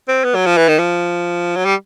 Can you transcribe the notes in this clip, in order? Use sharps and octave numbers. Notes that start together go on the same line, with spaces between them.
C4
B3
F#3
F3
E3
D#3
F3
F#3
G3